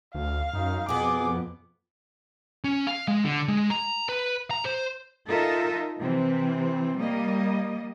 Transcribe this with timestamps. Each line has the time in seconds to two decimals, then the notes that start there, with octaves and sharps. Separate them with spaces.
0.15 D2 F5
0.53 F#2 D#4
0.89 F2 B2 B3 G#4 D6
2.64 C#4
2.87 F5
3.08 G#3
3.24 D3
3.48 G#3
3.70 A#5
4.09 B4
4.51 A#5
4.65 C5
5.27 D#4 F4 A4 A#4 D#5 E5
5.99 C3 E3 C4
6.97 G3 A#3 D#5